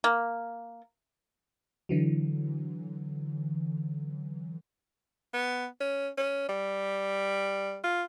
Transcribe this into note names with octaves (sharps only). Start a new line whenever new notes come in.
A#3
D3 E3 F#3
B3
C#4
C#4
G3
F4